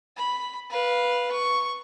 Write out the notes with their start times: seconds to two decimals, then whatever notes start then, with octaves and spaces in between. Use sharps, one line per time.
0.17 B5
0.71 B4 F5
1.32 C#6